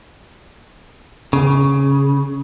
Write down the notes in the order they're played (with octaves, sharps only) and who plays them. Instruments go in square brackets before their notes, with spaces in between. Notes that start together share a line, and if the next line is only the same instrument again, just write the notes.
[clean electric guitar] C#3